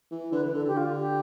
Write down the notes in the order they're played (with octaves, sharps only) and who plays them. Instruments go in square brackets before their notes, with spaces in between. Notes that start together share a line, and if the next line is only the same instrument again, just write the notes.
[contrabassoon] E3
[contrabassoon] D3 [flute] B4
[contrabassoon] E3
[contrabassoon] D3 [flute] A4
[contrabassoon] D3 [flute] G4
[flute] F4
G4